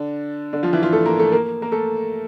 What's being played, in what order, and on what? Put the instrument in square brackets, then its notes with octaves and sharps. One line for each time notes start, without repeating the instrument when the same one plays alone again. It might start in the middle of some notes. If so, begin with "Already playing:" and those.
Already playing: [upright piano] D3 D4
D3 D4
F3 F4
E3 E4
F3 F4
A3 A4
A#3 A#4
A3 A4
A#3 A#4
A#3 A#4
A3 A4